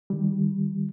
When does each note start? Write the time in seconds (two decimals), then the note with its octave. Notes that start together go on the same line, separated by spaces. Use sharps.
0.10 D#3 G3